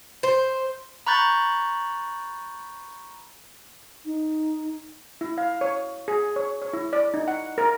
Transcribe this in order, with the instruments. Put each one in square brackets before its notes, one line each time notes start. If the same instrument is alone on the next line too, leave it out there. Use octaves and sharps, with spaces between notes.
[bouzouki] C5
[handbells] A#5 B5 C#6 F#6 G6 A6
[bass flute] D#4
[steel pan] E4
F5
C#5
G#4
C#5
C#5
E4
D5
D#4
F#5
A#4